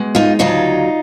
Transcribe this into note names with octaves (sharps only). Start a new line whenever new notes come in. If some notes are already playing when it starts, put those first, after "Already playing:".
Already playing: B2 G#3
D#4 F4
D2 C#3 F#3 D#4 F4